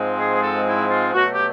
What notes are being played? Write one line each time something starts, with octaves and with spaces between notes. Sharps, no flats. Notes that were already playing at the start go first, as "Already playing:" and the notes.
Already playing: G#2 F3 G#3 C4
G#4
G#4
A4
E4
F4
B2 F#3 A3 F#4
G4